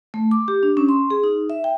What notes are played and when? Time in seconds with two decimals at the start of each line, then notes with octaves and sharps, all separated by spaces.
0.14 A3
0.31 D6
0.48 G4
0.63 D4
0.77 C#4
0.89 C6
1.10 G#4
1.24 D#4
1.50 E5
1.64 G5